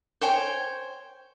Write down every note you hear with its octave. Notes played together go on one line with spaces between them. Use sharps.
C5 C#5 G5 G#5